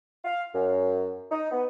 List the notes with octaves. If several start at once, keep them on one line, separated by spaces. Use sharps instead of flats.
F5
F#2
D#4
B3